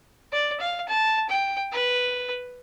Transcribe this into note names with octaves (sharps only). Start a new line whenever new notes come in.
D5
F5
A5
G5
B4